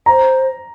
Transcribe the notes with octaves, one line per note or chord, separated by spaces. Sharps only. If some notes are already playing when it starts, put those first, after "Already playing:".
C5 A#5